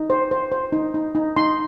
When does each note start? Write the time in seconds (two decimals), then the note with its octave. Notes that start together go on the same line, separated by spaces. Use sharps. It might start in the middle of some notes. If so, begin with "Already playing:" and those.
Already playing: D#4
0.10 C5
0.31 C5
0.52 C5
0.72 D#4
0.94 D#4
1.15 D#4
1.36 D#4 C6